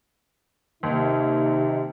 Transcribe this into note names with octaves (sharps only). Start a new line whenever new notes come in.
D#2 C3 D#4